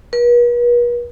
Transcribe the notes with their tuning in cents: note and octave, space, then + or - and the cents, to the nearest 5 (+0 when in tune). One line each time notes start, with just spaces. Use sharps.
B4 -45